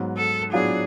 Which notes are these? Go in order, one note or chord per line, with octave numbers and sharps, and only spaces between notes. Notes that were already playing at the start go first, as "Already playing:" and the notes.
Already playing: G#2 F#3 B3
A4
A2 F#3 B3 D4 F4 G#4